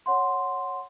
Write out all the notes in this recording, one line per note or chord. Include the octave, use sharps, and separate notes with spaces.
C#5 F#5 C6